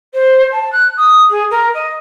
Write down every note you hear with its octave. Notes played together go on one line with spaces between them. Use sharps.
C5
A5
F#6
D#6
G#4
A#4
D#5